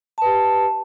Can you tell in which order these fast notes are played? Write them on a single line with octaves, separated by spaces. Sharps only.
A5 B4 G4